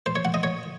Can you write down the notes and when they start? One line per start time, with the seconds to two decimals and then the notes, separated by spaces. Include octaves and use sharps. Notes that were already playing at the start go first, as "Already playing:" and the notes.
0.06 C5
0.16 C#5
0.25 F#5
0.34 D#5
0.43 C#5